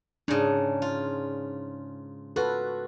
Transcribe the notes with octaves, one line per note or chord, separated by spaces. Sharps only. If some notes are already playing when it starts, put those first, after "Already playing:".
G#2 C#3 D4
F4
F4 F#4 A4 B4